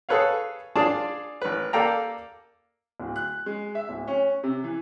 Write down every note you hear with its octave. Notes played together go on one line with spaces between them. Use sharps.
G#4 A4 B4 C#5 F5
D4 F4 G#4 D5 A5
A1 B4
A#3 A4 D5 F5 G5 A#5
D1
F#6
G#3
E5
D1
C#4
C3
E3